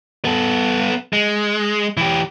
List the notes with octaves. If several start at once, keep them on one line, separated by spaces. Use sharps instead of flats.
B3 A4
G#3
E3 G4